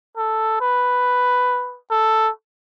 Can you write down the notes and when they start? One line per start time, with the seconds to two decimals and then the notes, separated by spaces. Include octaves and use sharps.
0.17 A4
0.61 B4
1.91 A4